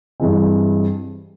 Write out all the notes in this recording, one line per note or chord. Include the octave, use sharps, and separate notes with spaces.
G2 E3 G#3 C4